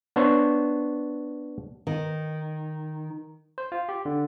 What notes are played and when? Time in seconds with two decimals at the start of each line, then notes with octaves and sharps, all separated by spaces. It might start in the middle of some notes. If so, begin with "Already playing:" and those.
0.16 B3 D4 C5 C#5
1.87 D#3
3.58 C5
3.72 F4
3.89 G4
4.05 D3